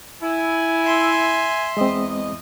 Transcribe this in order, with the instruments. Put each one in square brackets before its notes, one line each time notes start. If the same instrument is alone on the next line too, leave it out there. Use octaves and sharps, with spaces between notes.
[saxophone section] E4 [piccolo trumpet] G#5
[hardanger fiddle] E5 C6
[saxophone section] E2 D#5 [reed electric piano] G#3 C4